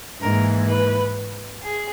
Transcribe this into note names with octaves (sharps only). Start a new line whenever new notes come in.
G#2 E3 A#3 A#4
B4
G#4